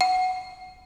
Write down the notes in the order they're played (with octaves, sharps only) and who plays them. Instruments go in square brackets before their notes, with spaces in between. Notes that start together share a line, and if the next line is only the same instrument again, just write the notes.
[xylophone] F#5